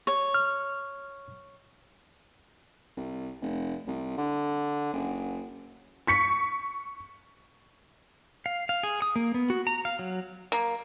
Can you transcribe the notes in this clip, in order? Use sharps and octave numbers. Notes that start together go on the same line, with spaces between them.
C#5
F6
C2
F1
C2
D3
F#1
C#6 B6 C#7
F5
F5
G#4
D#6
A#3
B3
F#4
A#5
F5
F#3
A#3